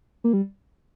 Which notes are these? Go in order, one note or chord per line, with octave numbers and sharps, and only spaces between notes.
A#3
G3